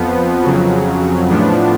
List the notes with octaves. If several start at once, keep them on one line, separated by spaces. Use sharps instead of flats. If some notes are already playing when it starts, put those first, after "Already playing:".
Already playing: F2 F3 B3
F2 C#3 F#3
A2 F3 B3 D4